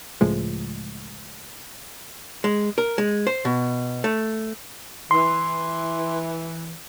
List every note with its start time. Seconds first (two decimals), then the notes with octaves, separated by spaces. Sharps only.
0.21 C#2 A2 F3 G#3
2.44 G#3
2.78 A#4
2.98 G#3
3.27 C5
3.45 B2
4.04 A3
5.11 E3 C6